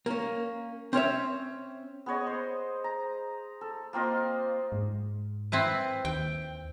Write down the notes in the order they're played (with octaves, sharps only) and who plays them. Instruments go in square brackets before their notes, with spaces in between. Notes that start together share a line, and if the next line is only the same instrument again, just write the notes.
[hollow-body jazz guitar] A#3 C#4
C4 C#4 C#5 E5
[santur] B3 G#4 C#5 D#5
C5
A#5
A4
A#3 C4 F4 D#5
[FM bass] G#2
[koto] C4 E4 B4
[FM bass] D#2 [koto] G5